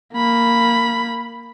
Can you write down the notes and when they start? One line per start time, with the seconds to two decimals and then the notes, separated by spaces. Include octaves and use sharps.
0.14 A#3 B5